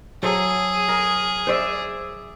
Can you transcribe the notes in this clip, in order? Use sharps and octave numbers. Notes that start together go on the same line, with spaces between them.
F#3 G#4 A4 C5
A#4
C5 D5 E5